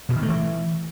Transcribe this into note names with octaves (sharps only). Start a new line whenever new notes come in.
B2
D#3
A3
E3